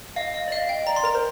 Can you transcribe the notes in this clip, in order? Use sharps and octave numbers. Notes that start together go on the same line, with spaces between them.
D#5 F5
D#5
D5
D#5 F5
G5
D5 A#5
C6
A#4 A#5
C5